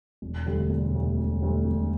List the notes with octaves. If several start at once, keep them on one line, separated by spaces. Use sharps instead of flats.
E1
D2 D3 G3
E1
D2 D3 G3
E1
D2 D3 G3
E1